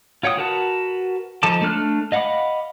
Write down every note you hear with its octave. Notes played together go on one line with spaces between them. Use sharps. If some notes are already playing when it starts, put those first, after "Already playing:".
F4 C#5 F#5 G5 D#6
F#4 A#4 B4 F#5 A5
F3 D#4 A4 A5 D6
A3 D4 F6 F#6
D#5 F5 F#5 B5 D6